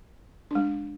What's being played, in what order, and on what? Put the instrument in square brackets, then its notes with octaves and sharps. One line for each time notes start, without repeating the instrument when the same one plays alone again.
[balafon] G#3 D4